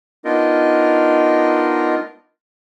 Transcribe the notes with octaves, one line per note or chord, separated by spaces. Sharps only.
B3 D4 D#4 F4 A#4 D#5